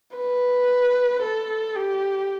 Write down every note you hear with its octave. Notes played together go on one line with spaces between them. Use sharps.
B4
A4
G4